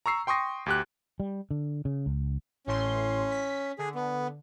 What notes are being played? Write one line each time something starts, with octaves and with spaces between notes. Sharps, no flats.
A#5 C#6 E6 C7
G5 C6 C#6 D#6 A#6
D2 G4 F#6
G3
D3
C#3
C#2
A1 A2 C#4 C6
B6
D3 G#4
B3